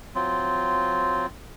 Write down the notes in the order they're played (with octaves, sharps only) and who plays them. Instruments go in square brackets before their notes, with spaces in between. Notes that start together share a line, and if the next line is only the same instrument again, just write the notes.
[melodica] F#3 C4 F4